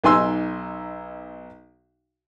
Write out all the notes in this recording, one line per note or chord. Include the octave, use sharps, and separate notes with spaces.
B1 D#4 G#5 C6 E6